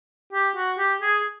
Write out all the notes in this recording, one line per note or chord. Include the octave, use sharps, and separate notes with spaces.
G4
F#4
G4
G#4